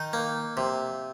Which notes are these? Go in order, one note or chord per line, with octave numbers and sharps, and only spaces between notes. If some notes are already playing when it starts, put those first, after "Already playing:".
Already playing: D#3 D#4
A#3
C3